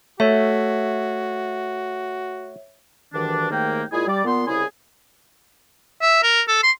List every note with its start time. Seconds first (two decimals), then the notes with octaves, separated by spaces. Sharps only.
0.20 A3 F#4 C#5 E5
3.13 D2 G2 D#3 E3 D4
3.50 D#2 G#2 D#3 A3 A#3 G5
3.92 A#2 G#3 E4 F4 G#4
4.07 G3 D5
4.25 A#2 B3 C6
4.47 C2 C#3 E4 G#4
6.02 E5
6.23 A#4
6.48 A4
6.63 C6